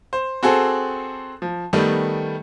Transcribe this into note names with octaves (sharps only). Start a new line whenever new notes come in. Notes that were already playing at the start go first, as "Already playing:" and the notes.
C5
C4 F#4 G#4 A4 C5
F3
D#3 G3 A3 B3